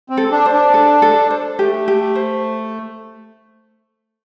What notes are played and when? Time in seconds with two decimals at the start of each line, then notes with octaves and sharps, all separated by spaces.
0.10 C4
0.17 A4
0.31 D4
0.46 C5
0.53 D4
0.74 A4
1.02 A4
1.30 C5
1.59 A3 G4
1.88 G4
2.15 C5